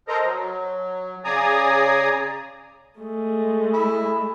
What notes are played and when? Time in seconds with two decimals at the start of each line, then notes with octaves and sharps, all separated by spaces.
0.08 A4 A#4 C5 D#5 A#5
0.25 F#3
1.24 C#3 G#4 D5 G#5 A#5 D#6
3.00 G#3 A3
3.74 E4